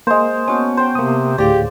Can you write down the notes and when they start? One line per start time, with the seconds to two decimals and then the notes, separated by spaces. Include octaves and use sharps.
0.07 G#3 A#3 C5
0.48 B3 C#4 F#4 A5
0.77 C5 G5
0.95 C3 A#3 D#6
1.38 D2 A2 G4 G#4 D5 F5